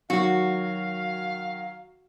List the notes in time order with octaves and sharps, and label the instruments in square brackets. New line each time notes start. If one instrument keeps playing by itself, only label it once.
[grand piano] D#3 F#3 [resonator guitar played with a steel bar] F#4 [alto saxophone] F5